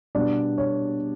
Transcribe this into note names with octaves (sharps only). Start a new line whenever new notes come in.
B2 G3 B3 D4 D5
C#5